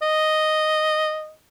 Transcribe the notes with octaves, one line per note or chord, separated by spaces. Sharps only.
D#5